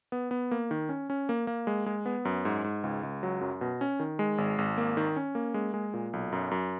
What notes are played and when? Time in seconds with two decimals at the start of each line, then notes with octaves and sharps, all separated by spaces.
0.12 B3
0.31 B3
0.51 A#3
0.71 D#3
0.89 C#4
1.10 C#4
1.29 A#3
1.47 A#3
1.67 G#3
1.86 G#3
2.06 B3
2.25 F#2
2.45 G#2
2.64 G#2
2.84 C#2
3.03 C#2
3.23 F#3
3.41 F#2
3.61 B2
3.81 C#4
4.00 D#3
4.19 G#3
4.38 G#1
4.58 G#1
4.77 A#3
4.97 D#3
5.16 C#4
5.35 A#3
5.54 G#3
5.74 G#3
5.94 A#2
6.13 B1
6.32 F#2
6.51 F#2